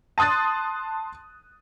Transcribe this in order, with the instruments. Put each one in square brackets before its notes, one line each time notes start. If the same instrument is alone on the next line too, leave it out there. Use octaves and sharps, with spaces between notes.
[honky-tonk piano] A5 C6 D#6 F#6 A6